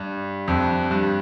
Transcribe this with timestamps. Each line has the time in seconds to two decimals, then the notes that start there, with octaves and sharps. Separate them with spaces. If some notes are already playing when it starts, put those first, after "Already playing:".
Already playing: G2
0.48 F2
0.91 G2